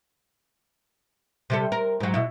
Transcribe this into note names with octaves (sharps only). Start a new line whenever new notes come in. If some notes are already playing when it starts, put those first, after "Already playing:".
C3 G3 A4
A#4
G#2 F#3
B2 E4